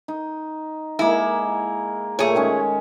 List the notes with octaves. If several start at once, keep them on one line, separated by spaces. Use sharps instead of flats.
D#4
G#3 A#3 E4
A#2 A3 G#4 C#5
D#3 G#3 C#4